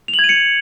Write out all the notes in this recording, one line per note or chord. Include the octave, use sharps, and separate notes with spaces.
F7
F#7
G#6
D#7
C#7